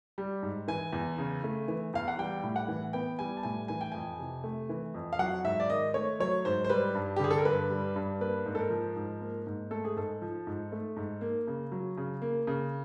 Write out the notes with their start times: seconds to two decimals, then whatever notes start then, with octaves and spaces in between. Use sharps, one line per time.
0.18 G3
0.43 G#2
0.68 E3 G#5
0.93 E2
1.18 C#3
1.44 A3
1.68 E3
1.94 E2 F5
2.08 F#5
2.18 G3 G5
2.43 A2
2.56 F#5
2.68 E3
2.93 B3 G5
3.19 G3 G#5
3.37 A5
3.43 A2 G#5
3.68 E3 G#5
3.81 G5
3.92 F2 G#5
4.19 C3
4.44 A3
4.69 E3
4.94 F2
5.13 F5
5.19 F#3 F#5
5.44 G#2 E5
5.60 D5
5.69 D#3 D#5
5.94 A3 C#5
6.20 F#3 C#5
6.45 G#2 C5
6.64 C5
6.69 G3 B4
6.95 G2
7.17 G4
7.20 D3 G#4
7.31 A4
7.38 A#4
7.45 G2 B4
7.70 G3
7.96 G2
8.21 A#3 B4
8.46 G#2
8.55 A4
8.59 A#4
8.70 F3
8.96 G#2
9.21 A#3
9.47 G#2
9.71 A3 A4
9.85 G#4
9.96 G#2 A4
10.22 F3
10.47 G#2
10.72 A3
10.96 G#2
11.21 A#3
11.47 C#3
11.72 F#3
11.97 C#3
12.22 A#3
12.47 C#3